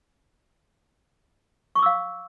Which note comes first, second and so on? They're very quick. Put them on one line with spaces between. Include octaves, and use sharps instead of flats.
C#6 D6 E6 F5